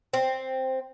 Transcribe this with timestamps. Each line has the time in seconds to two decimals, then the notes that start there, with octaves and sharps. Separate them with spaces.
0.14 C4